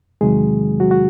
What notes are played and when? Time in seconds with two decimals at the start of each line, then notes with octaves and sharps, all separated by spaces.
0.21 E2 C3 D#3 F#3 G#3 G#4
0.80 F#3 F#4
0.91 F#4